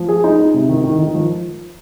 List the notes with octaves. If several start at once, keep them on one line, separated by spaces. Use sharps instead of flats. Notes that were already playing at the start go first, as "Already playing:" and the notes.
Already playing: F3
G#4
D#4
D#4
C3
D#3
D#3
D#3
F3